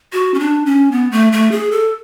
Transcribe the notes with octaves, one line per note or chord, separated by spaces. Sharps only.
F#4
C#4
D4
C#4
B3
A3
A3
G#4
A4